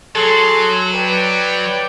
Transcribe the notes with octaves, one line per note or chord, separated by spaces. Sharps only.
F#3 G#4 A4 C6
B4 D5 G5